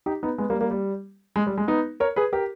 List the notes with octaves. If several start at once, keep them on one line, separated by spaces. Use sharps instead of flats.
D#4 G4
B3 D#4
G#3 B3
G3 A#3
G3 A#3
G3
G#3
G3
G#3
B3 D#4
A#4 C#5
G#4 B4
G4 A#4